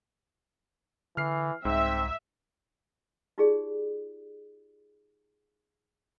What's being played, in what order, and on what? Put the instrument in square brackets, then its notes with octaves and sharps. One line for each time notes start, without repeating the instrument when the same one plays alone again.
[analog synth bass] D3 [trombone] E3 [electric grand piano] F6 C7
[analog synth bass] C2 [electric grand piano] G#2 [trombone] C4 [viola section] E5
[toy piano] D#4 F4 G4 G#4 D5